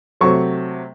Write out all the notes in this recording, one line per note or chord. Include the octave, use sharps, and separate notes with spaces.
C3 F#3 A3 C#6